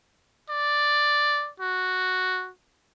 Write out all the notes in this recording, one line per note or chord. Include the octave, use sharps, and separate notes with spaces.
D5
F#4